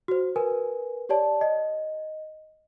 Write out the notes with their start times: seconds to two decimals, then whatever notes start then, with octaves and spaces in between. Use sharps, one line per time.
0.08 F#4 C5
0.36 A#4 B4 G#5
1.09 G4 C#5 D5 A5
1.41 D#5